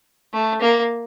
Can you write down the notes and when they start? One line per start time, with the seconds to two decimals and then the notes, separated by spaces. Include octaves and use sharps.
0.33 A3
0.61 A#3